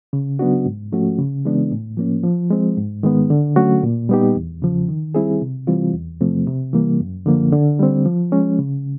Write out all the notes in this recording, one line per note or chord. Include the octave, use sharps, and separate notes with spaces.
C#3
F#3 B3 D4 F#4
G#2
F3 A3 C#4 F#4
C#3
E3 G#3 B3 D4
A2
F3 A#3 C#4
F3
G#3 C4
G#2
D#3 G#3 B3
D3
F#3 A3 C#4 F#4
A#2
G3 B3 D#4 G4
E2
C#3 F3
D#3
G3 C4 E4 G#4
C3
E3 G3 C4 F4
E2
C3 F3 A3 C4
C3
E3 G3 A#3
F#2
D3 F3 A#3
D3
G3 C4
F3
G#3 C#4
C#3